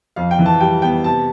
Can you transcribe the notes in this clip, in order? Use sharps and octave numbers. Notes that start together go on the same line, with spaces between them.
F2 F5
G5
E3
A5
G3 G5
B3 G5
C3 A5